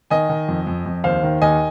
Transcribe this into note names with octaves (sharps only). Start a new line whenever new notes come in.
D#3 D#5 G#5
D#3
F2
F2
F2
D#2 C5 F5
D#3
D#2 D#5 G#5